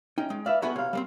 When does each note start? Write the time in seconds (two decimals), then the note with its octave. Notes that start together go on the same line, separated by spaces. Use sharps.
0.18 C#4 D#4 D#5 G5
0.30 G#3
0.46 B4 D5 E5 F5
0.62 B3 F#4 G#4 A4 B4 B5
0.76 C3 C#5 F5
0.93 G3 A#3 C4